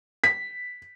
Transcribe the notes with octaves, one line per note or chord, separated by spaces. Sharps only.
B6